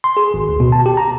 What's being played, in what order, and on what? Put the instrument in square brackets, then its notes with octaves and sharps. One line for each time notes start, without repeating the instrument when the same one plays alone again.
[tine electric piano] C6
G#4
G#1
D2
B2
A5
G4
A#5